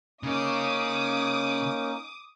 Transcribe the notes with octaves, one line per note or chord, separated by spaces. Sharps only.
C#3 A#3 C#4 D#4 D6 D#6